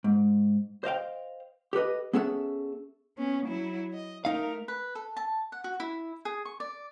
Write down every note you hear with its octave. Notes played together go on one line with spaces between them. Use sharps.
G#2
C5 D#5 F5 G5
G4 A4 B4 D#5
B3 C#4 G#4 A4 E5 F#5
B3 C#4
F#3 E4
D#5
A3 D#4 A#4 F5
B4
A4
A5
F#5
F#4
E4
G#4
C#6
D5